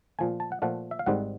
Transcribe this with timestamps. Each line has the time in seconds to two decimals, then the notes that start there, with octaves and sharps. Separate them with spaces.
0.19 A#2 F3 A3 G#5
0.40 A5
0.52 F#5
0.62 A#2 F3 A3 F#5
0.91 E5
0.99 F5
1.06 G#1 G#2 D#3 G3 C4 F#5